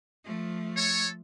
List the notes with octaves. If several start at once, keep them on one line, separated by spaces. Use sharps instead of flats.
F3 A3
A4 C#5